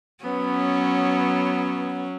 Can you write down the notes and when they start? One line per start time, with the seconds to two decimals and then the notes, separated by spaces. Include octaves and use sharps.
0.24 F#3 B3 C#4